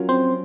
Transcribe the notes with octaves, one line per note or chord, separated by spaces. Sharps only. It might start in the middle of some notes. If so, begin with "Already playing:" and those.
Already playing: F#3 C#4 F4 A#4
C4 C5